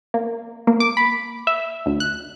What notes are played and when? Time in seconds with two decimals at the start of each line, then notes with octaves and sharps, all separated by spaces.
0.14 A#3
0.67 A#3
0.80 D6
0.97 B5
1.47 E5
1.86 D2
2.00 F#6